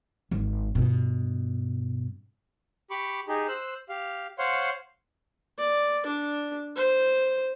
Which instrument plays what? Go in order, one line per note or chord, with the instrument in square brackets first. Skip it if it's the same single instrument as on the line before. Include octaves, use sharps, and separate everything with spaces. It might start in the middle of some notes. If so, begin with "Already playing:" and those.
[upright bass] G#1
G2 B2
[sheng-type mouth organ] G4 B5 C#6 D6
D#4 G4 G#4
C5 E6 F#6
G4 F5
C5 C#5 F5 F#5 C6
[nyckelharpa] D5
D4
C5